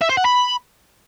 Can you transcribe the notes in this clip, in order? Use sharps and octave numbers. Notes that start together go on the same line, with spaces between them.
E5
C5
F#5
B5